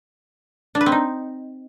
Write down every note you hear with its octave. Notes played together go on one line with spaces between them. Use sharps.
D4
B4
C4
D#4